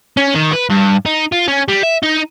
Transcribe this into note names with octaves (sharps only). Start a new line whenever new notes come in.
C#4
D#3
B4
G2
D#4
F4
C#4
G3
E5
D#4